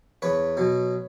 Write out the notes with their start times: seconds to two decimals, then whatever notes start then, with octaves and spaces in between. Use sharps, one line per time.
0.22 E2 B4 C#5
0.57 B2 F#3